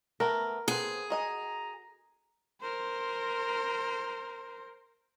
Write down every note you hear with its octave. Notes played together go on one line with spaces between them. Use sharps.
A3 B3 A#4
B3 C4 G#4
F#4 D#5 G#5 A#5
A#4 C5